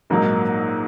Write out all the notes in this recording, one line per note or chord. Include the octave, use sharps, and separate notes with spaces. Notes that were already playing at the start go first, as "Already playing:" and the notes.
A#1 G#2 F#3 A#3 D#4